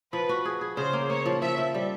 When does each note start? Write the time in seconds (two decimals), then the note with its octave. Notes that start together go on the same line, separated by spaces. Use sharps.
0.12 F3 B4
0.29 F#4
0.45 G#4
0.61 G#4
0.77 C#3 C5
0.93 A#3
1.10 A#3 C#5
1.26 F3
1.42 F3 E5
1.58 F3
1.74 G3